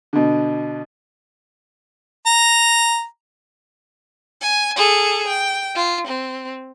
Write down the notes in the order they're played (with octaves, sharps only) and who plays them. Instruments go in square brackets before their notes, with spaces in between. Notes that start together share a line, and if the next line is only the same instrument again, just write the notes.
[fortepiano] B2 D3
[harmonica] A#5
[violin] G#5
G#4 A4
G5
F4
C4